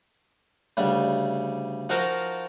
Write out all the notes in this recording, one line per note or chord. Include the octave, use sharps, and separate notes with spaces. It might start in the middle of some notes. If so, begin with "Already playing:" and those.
D2 C#3 G3
F3 D#4 F#4 A#4 C5 F5